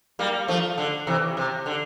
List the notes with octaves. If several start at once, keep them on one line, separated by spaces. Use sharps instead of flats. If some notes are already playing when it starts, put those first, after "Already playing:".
G3 A#3
F3 A3
D3
C3 E3
C3
D3